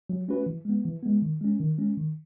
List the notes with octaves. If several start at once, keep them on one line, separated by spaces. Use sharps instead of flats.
F#3
A3 C#4 F#4 B4
E3
G#3 B3
E3
G#3 B3
D#3
G#3 C#4
D#3
G#3 C#4
D#3